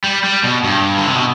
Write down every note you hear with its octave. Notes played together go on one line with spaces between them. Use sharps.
G3
G3
B2
G2
D3
C3
B2